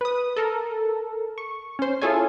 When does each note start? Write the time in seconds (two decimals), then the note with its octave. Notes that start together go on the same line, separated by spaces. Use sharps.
0.01 B4 D#6
0.36 A4 A#4
1.38 C#6
1.79 C#4 C5
2.01 E4 F4 G#4 A4 C#5 G#5